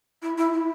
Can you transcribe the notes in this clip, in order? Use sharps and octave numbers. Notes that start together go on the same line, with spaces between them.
E4
E4
E4